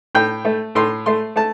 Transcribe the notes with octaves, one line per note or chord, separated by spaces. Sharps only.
A2 G5
A3
A2 C6
A3 C6
A3 A5